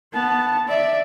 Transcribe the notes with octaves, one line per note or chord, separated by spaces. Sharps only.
B3 A5
D5 E5